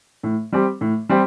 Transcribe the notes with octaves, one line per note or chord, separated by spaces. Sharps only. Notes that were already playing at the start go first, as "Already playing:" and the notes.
A2
G3 C4 G4
A2
G3 C4 G4